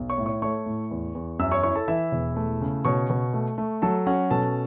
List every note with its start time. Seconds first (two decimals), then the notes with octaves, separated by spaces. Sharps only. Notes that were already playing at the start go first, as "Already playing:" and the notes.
Already playing: B1
0.10 C#5 C#6
0.18 A2
0.26 C#5 C#6
0.42 A3 C#5 C#6
0.66 A2
0.91 E2
1.15 E2
1.39 F#2 E5 E6
1.52 C#5 C#6
1.63 E4 C#5 C#6
1.75 A4 A5
1.88 E3 E4 E5
2.12 E1
2.36 A3
2.61 C#3
2.85 B2 C#5 C#6
3.10 B2
3.34 A3
3.58 A3
3.82 F#3 A4 A5
4.06 C#4 F#4 F#5
4.31 B2 A4 A5